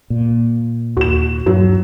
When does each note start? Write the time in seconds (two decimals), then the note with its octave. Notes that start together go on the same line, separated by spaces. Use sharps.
0.10 A#2
0.97 D#2 F#4 E7
1.46 G2 F#3